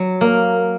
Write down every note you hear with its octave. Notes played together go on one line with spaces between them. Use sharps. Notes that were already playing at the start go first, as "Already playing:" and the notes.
Already playing: F#3
A#3